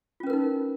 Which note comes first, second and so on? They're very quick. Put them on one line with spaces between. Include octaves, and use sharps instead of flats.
F4 C#4 B4 A#4 D#4